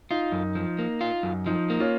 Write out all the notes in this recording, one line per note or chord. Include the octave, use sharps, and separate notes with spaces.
D#4 F4
F#2
F3
A#3
F4
F#2
F3 D#4
A#3
C#4 F4